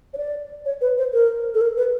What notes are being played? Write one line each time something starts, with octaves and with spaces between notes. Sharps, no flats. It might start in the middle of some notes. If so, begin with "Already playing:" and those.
C#5
D5
C#5
B4
C5
A#4
A4
A#4
B4